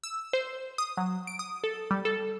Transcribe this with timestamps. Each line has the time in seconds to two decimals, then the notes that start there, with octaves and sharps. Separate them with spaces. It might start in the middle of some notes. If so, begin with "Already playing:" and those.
0.04 E6
0.33 C5
0.78 D#6
0.97 F#3
1.27 D7
1.39 D#6
1.64 A4
1.91 G3
2.05 A4